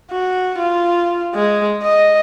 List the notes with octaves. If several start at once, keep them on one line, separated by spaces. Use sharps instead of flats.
F#4
F4
G#3
D#5